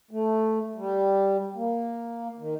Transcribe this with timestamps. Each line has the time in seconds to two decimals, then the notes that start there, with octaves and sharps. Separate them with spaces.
0.11 A3
0.76 G3
1.55 A#3
2.39 D#3